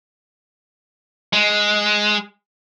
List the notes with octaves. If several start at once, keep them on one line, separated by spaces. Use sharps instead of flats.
G#3